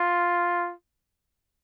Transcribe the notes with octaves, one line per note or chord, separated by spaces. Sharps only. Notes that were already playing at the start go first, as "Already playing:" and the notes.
Already playing: F4